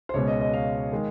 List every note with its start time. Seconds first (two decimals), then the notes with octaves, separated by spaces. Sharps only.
0.09 C5
0.14 C#2 B2 G#3 C#5
0.27 D#5
0.40 D#5
0.53 F5
0.92 D#3 G#3